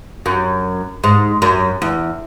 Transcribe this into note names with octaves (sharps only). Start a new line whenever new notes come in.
F#2
G#2
F#2
E2